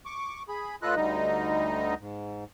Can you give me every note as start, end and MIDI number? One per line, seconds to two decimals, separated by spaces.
0.05 0.43 85
0.05 0.43 86
0.48 0.76 68
0.48 0.76 83
0.82 0.95 45
0.82 0.95 65
0.82 0.95 69
0.82 0.95 71
0.82 0.95 75
0.82 0.95 90
0.96 1.94 38
0.96 1.94 50
0.96 1.94 55
0.96 1.94 63
0.96 1.94 75
2.00 2.44 44